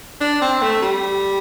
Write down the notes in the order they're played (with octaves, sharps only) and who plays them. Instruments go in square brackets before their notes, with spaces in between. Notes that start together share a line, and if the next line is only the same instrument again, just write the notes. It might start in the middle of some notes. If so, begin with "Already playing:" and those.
[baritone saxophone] D4
C4
A3
G3